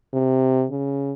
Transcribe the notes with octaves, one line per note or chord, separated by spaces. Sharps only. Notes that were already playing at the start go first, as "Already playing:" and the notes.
C3
C#3